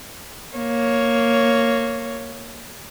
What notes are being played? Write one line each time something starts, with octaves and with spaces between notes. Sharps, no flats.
A#3 C#5